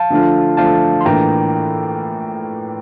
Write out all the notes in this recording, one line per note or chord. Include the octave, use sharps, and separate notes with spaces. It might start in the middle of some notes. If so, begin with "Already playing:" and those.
Already playing: F5 A5
D3 F3 A3 D4 F4
D3 F3 A3 D4 F4 F5 A5
C6
A2 E3 A#3 D4 F4 G5 A#5